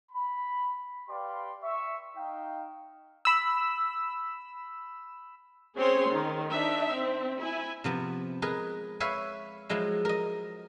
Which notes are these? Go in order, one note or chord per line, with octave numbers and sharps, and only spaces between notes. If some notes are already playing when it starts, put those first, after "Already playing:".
B5
G4 B4 D5 F5 G5 C6
E5 C#6
D#4 F5 G5
B5 E6
C4 C#4 G#4 C5 C#5 C6
D#3
D4 D#4 E5
C4
E4 E5 G#5
C3 F3 B3
G#3 G#4 A#4 B4
B4 C#5 E5 F5 G#5 B5
F3 F#3 G#3 E4
A#4 D#5